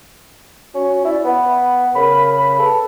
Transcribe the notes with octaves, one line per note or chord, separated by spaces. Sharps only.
C#4 F#4
E4 D5
B3 B5
C#3 A#4 B5
A4 B4